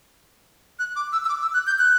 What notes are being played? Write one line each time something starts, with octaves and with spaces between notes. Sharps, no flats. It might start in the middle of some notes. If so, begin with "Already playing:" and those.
F#6
D6
E6
E6
D6
E6
F#6
G6
F#6